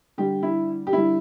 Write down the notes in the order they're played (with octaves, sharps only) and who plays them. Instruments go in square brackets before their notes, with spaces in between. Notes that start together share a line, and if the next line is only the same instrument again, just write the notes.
[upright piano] D3 G3 G4
E4
G4
D3 G3 E4